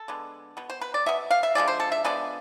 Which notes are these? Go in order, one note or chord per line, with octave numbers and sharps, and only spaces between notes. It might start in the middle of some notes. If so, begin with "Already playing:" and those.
Already playing: A4
D3 G#3 B3
B2 B3
C5
B4
D5
B2 B3 E5
F5
E5
D3 F3 G#3 D5
C5
A4
E5
D3 F3 G#3 B3 D5